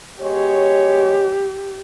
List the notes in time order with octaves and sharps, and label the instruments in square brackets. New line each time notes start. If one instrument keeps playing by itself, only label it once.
[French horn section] B2 G#3 C#5 [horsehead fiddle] G4